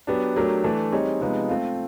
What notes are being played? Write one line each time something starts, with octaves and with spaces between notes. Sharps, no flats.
F#3 B3 D4 G4
F#3 A3 D4 G4 A#4
E3 A3 D4
G3 C4 D#4 G#4 C#5
C3 F3 G#3 B3 D#4
A3 C4 F4